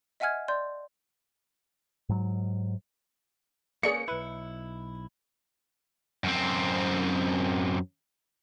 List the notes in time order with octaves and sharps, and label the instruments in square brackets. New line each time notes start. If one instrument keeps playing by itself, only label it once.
[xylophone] D#5 E5 F#5 G#5 F6 G#6
D5 C6 G6
[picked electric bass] G#2 F#3
[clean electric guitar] A#3 C4 C#4 [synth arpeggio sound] G#4 D5 C#6 [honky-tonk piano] C#7
[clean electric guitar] B1 E4 [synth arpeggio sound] B4
[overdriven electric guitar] F#2 C4